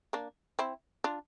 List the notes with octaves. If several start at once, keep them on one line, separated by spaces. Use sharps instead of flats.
A#3 D4
C4 E4
D4 F4